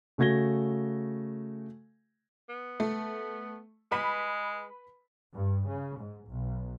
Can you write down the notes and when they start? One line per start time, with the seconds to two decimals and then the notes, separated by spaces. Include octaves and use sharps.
0.18 C#3 A3 F#4 G#6 A#6 G7
2.49 B3
2.80 A3
3.91 G#3 B4 B5 B6
5.35 G2
5.68 C#3
5.99 G#2
6.29 B1